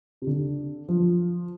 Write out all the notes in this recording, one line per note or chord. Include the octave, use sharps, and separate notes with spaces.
C3
D3
F3